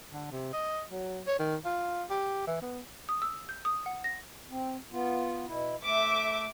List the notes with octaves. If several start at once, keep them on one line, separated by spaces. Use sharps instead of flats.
D3
C3
D#5
F#3
C#5
D#3
F4
G4
E3
B3
D#6
E6
G6
D#6
F#5
A#6
C4
B3 F4
B2 E4
A3 E5 D6